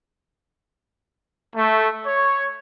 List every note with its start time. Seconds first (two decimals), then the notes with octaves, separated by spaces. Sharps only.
1.54 A3
2.06 C#5